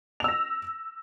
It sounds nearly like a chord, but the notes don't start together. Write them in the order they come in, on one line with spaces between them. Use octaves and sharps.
F7 E6 A#6